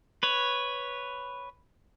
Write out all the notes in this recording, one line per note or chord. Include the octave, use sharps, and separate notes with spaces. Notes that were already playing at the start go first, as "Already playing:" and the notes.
B4 C#5